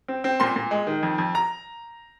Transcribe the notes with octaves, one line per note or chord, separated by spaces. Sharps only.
C4
C4
A#2 C6
A#2
G#3
D#3
F2
F2
A#5